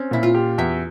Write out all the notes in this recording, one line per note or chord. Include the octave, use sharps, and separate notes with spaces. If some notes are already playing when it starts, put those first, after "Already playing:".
Already playing: C4 C#4
A#2 E4
F4
G4
E2 E5